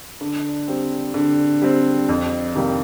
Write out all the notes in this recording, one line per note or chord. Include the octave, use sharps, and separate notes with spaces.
D3
G3 C4
D3
G3 C4
F2
C3 D#3 G3 A#3